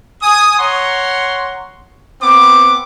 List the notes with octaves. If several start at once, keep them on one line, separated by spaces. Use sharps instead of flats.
G#5 D#6
C#5 F#5 A#5 C6 C#6
B3 C4 D6